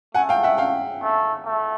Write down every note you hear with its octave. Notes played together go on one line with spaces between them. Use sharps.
A3 F#5 G#5
F5 G5
E5 F#5
F5 G5
A3
A3